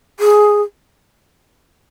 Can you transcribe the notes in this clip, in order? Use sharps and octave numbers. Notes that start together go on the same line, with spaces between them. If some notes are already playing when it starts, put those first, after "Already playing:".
G#4